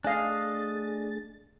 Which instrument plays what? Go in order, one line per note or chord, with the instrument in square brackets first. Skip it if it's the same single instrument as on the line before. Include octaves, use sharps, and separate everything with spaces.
[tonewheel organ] A3 G#4 A6 [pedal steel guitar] D4 D#5 [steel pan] F5 G#5